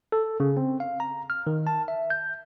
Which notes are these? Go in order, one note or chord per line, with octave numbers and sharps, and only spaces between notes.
A4
C#3
C4
F5
A#5
F6
D#3
A5
E5
G6